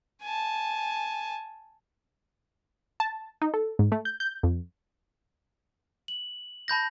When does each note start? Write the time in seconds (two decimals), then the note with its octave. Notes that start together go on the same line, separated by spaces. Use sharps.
0.22 G#5 A5
3.00 A5
3.42 D#4
3.54 A4
3.79 G#2
3.92 A3
4.05 G6
4.20 G6
4.43 F2
6.08 F#7
6.68 A5 B5 G6 A#6